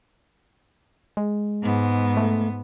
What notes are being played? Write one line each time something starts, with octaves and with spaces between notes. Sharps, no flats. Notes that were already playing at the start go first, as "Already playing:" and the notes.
G#3
G#2 B3
A3